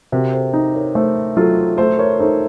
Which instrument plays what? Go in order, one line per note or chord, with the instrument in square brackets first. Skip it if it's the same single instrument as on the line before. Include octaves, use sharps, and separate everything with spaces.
[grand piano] C3 [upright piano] F#4 A#4
[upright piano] A4 C5
[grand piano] D#4
[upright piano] A#4 C#5
[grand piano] A3 [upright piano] A4 C5
[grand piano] F#3 [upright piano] F4 A4
[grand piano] A3 [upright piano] A4 C5
[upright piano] A#4 C#5
[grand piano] D#4 [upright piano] A4 C5